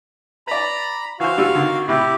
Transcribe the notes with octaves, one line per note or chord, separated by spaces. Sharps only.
B4 D5 A#5 B5
E3 F#4 C5 F5
G2 G3 E6
D3 D#3 C4
A2 C3 E4 G4